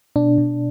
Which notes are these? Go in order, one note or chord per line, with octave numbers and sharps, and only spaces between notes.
B2 D4
B2